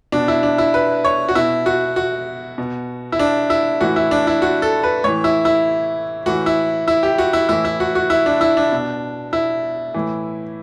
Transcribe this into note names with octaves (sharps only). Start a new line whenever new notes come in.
B2 D4
E4
D4
E4
B4
C#5
F#4
B2 E4
F#4
F#4
B2
E4
D4
E4
A2 E3 F#4
E4
D4
E4
F#4
A4
B4
A2 E3 C#5
E4
E4
A2 E3 F#4
E4
E4
G4
F#4
E4
A2 E3 E4
E4
F#4
F#4
E4
D4
E4
D4
B2
E4
A2 E3